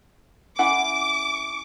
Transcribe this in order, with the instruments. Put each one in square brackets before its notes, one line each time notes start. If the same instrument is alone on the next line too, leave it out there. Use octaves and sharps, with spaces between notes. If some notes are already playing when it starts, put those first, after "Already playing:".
[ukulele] C#4 E4 F#5 [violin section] D6